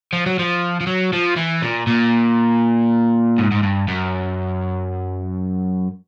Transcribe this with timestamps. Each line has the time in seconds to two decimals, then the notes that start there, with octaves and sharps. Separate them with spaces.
0.13 F3
0.26 F#3
0.39 F3
0.81 F3
0.87 F#3
1.13 F3
1.37 E3
1.62 A#2
1.87 A#2
3.38 G#2
3.51 G#2
3.63 G2
3.88 F#2